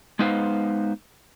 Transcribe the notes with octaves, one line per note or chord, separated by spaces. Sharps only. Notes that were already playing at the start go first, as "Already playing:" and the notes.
G#3 B3 D#4 B4 C5 F5